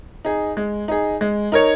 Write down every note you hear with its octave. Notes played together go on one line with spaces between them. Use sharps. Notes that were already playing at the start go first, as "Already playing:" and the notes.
D#4 G#4
G#3
D#4 G#4
G#3
D#4 A#4 C#5